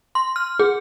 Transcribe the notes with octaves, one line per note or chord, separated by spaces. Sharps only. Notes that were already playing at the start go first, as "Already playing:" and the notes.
C6
F6
G#4